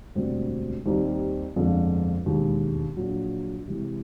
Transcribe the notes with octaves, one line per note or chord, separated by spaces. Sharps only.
E1 D2 D3 G3 C4
D#2 D#3 G3 C4 D#4
G1 F2 D3 F3 G#3
E1 D#2 D#3 G#3
A#1 A#2 F#3
C3 E3 G#3